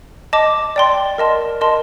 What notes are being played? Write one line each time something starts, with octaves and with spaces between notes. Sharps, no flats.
D#5 A5 D6
D5 G5 C6
A#4 D#5 A5 C6
A#4 D#5 A5 C6